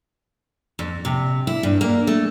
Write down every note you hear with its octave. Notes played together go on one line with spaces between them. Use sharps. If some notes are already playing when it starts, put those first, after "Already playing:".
F2
C3
E4
G2
A#3
A3